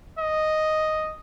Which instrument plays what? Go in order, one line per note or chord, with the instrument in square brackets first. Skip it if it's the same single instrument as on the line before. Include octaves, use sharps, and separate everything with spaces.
[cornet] D#5